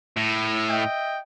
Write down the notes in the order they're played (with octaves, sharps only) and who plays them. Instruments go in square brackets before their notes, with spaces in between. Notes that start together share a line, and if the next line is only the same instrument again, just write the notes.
[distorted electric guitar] A2
[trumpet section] D#5 E5 G5